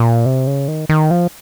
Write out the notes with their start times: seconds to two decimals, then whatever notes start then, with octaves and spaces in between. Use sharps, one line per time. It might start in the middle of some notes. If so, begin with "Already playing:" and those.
Already playing: A#2
0.26 C3
0.47 C#3
0.68 D#3
0.89 D#3
1.11 F3